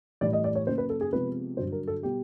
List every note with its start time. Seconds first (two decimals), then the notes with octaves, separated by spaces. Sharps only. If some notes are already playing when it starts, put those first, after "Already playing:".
0.21 A2 E3 G3 D5
0.33 D#5
0.44 D5
0.55 C#5
0.67 C#3 F#3 A#3 C5
0.78 B4
0.89 A4
1.01 G#4
1.12 C3 F3 G#3 B3 B4
1.57 G2 D3 F#3 C5
1.72 A#4
1.88 A4
2.03 B2 G3 B3 G4